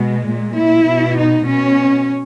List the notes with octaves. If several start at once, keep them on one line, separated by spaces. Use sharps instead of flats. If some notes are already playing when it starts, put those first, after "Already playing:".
Already playing: B2 G#3
A#2
E4
B2
D#4
B2 C#4